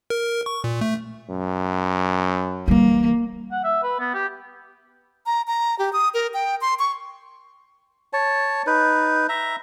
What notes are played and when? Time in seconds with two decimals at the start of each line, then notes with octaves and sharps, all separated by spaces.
0.10 A#4
0.46 C#6
0.64 A#2
0.81 A3
1.29 F#2
2.68 E3 G3 A#3
3.51 F#5
3.64 E5
3.83 B4
3.99 B3
4.14 G4
5.26 A#5
5.47 A#5
5.79 G4
5.93 D#6
6.14 A#4
6.34 G5
6.61 C6
6.79 C#6
8.13 C#5 A5
8.67 D#4 B4
9.29 E5 A#5